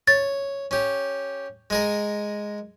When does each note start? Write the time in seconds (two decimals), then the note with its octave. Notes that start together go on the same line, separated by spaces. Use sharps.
0.07 C#5 A6
0.71 C#4 G4
1.70 G#3 G#4 A#4